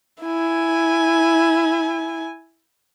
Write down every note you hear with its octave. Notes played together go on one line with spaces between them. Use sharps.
E4 G#5